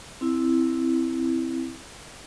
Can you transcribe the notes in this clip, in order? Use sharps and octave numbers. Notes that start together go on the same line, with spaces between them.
C4 E4